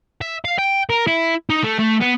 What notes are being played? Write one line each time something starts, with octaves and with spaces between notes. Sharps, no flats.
E5
F5
G5
A#4
E4
D#4
A3
A3
B3